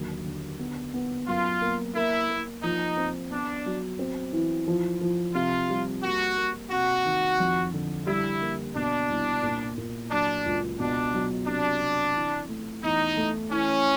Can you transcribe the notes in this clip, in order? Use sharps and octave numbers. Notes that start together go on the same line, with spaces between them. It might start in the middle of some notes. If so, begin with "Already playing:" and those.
Already playing: D#2 D3 F#3
D3
B3
B3
F#2 F4
A#3
A#3 E4
A#3
F3 D#4
C4
B3 D4
F#3
C4
E3
F3
F3
C3 F4
G3
A#3 F#4
A#3
C3 F#4
D#3
F2
D3
G3 E4
A#3
B2 D4
C2
A#2
A#2
F#3 D4
C#2
B2 D4
F#3
C3 D4
C3
E3
A3
E2 D#4
A3
E3 C#4